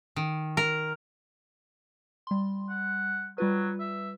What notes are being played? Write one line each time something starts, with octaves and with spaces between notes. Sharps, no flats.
D#3
A#4
G3 C6
F#5
F#3 G3 F4 B4
E5